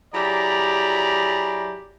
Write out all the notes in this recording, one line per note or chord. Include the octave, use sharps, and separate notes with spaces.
F#3 E4 G4 G#4 D5 A#5